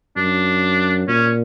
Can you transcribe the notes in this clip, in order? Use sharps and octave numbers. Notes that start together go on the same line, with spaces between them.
F#2 D4
A#2 C#4